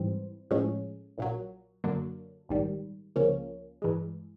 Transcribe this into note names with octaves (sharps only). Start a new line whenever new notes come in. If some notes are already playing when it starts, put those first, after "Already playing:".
Already playing: G#2 E3 G3 C4
A2 F3 G#3 C#4
A#1 A#2 F#3
F#2 D3 F#3 A#3 D4
A#1 G#2 D#3 G3
C#2 C#3 F3 A#3 C#4
G2 E3 G#3